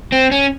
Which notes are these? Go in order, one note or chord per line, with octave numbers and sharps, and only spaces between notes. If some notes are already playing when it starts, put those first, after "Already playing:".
C4
C#4